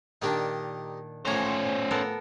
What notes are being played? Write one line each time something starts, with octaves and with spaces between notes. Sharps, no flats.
A#2 D#3 D4 D#4 G4 A#4
A2 E3 F3 C#4 C5 C#5 A#5
B3 A4 A#4